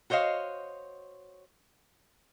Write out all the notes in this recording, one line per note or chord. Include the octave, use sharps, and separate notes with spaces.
F#4 C5 C#5 D#5 F5